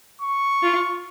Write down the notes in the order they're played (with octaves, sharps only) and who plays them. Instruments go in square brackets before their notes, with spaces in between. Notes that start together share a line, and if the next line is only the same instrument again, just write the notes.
[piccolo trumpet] C#6
[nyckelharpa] F4